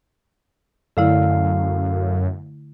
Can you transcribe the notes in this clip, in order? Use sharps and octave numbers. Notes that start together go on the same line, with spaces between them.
F#2 D3 A3 E4 A4 F5